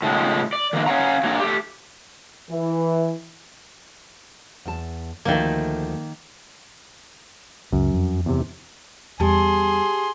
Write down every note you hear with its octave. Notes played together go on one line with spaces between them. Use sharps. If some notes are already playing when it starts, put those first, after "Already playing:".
A2 C#3 F3 G#3
D5
D#3 F3 A#3
C#4 C#5 F5 F#5 A#5
F#3 A#3 D4
A3 G4
E3
E2 A5
D2 D#3 F3 A3 A#3
C#2 F#2
F2
E2 C3
E2 G3 G4 G#4 A5 C6